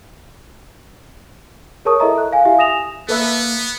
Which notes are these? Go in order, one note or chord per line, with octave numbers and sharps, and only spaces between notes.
G#4 A#4 C#5 A5 C#6 D#6
E4 A4 A#4 D#5 E5 A#5
A4 F#6
F5 G#5
E4 G4 E5 F5
G#5 D#6 A#6 E7 F7
A#3 B3 A4 B4 E5